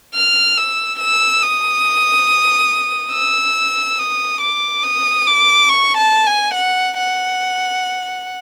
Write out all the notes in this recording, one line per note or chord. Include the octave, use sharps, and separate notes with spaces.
F6
E6
E6
D#6
E6
D#6
D6
D#6
D6
C#6
A5
G#5
F#5
F#5